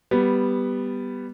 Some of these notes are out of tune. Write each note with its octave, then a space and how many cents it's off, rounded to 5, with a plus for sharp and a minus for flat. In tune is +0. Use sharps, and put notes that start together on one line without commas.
G3 +0 B3 +0